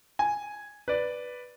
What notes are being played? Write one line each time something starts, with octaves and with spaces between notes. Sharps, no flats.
G#5
B4 D5